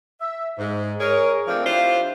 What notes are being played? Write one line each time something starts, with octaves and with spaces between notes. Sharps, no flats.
E5
G#2
G#4 A#4 C#5
F3 A3 A#3 C4 D4 F4
C4 D4 E4 F4 G4 C5